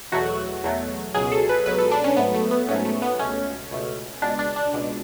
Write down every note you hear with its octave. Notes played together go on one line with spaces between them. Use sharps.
E2 B2 F#3 A3 F#4
E2 B2 F#3 A3
C#2 B2 F#3 G#4
A4
B4
C#2 B2 F#3 B4
A4
D4
C#4
G#2 F#3 A3 B3
A3
B3
G#2 F#3 A3 C#4
A3
B3
C#2 B2 A3 C#4
C#2 B2 A3
C#2 B2 G#3 D4
D4
D4
C#2 B2 G#3